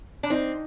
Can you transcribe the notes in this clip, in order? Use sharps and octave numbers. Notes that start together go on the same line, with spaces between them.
D4
C4 D#4